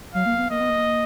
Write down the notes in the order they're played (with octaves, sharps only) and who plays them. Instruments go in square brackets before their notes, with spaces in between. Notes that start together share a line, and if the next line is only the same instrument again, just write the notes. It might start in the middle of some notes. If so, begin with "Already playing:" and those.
[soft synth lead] F#3 [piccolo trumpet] F5
[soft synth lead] A#3
B3
[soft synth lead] A#3 [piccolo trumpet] D#5
[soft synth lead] B3
A#3